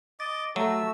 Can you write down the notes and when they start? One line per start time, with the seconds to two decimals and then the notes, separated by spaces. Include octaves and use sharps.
0.20 D#5 D6 A6
0.56 F#3 A3 F#4 E6